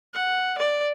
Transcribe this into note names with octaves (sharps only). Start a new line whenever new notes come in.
F#5
D5